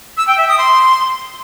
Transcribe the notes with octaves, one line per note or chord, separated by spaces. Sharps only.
E6
G5
E5
D#6
C6